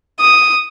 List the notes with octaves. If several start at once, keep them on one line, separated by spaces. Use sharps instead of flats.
D#6